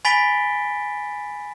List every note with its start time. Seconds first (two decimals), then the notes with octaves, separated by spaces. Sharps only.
0.05 G#5 B5 A6 B6 D7 G7